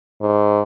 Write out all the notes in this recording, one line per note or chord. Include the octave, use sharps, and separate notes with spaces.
G#2